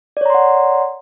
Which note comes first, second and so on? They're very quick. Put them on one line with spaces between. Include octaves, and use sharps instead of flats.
D5 C#5 A#5 C6 F#5